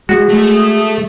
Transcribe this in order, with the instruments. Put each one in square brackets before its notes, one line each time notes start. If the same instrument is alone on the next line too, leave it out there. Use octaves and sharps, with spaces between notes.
[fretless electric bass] G#3 [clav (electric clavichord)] F#4 [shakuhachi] G#4
[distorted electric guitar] A3